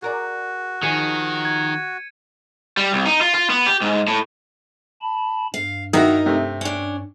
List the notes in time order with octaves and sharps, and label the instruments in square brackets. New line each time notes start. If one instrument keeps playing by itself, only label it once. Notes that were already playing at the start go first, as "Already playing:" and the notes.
[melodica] F#4 [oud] G#4 A#4 D5
[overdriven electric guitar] D#3 [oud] F3 D#4 G#4 [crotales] G#6 C#7 D#7
[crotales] G#6
[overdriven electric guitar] G3
C2
D#4
F4
F4
B3
G4
G#2
A2
[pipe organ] A5 B5
[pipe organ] G2 [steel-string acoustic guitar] F5
[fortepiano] D#3 E4 F#4 [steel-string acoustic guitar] D#4 A#4 D#5
[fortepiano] C3 A3
[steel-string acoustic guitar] C#4 D4